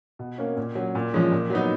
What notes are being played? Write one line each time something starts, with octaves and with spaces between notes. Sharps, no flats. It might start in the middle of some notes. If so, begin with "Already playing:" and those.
B2
A#3 C#4
A#2
F#3 C#4
A#2
F3 G#3 C#4
A#2
F#3 B3 D#4